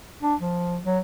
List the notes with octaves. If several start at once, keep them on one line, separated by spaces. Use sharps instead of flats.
D4
F3
F#3